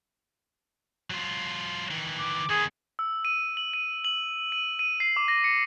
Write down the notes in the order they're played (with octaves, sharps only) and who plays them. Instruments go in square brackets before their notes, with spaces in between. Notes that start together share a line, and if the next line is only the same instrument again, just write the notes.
[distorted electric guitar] F#3 F4
D#3 E3
[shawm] D6
[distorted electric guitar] D#3 B3 [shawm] G#4
[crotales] E6
D#7
F#7
D#7
F#7
D#7
D#7
C7
D6
A#6
C#7